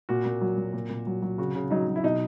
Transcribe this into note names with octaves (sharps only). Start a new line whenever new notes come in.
A#2 F#4
A#2
F#3
F#3
A#2
A#2
F#3
F#3
C#3 F#4
C#3
F#3 D#4
F#3
E4
B2 D#4